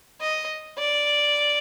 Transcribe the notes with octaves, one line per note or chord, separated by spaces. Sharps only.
D#5
D5